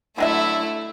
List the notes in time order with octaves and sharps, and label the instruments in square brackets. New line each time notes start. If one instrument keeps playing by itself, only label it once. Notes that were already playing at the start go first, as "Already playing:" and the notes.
[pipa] D3 F#3 E5 [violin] A3 E4